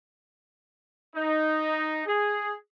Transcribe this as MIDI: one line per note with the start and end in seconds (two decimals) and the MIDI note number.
1.15 2.02 63
2.06 2.53 68